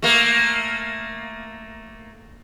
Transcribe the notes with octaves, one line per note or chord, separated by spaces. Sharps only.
A3 A#3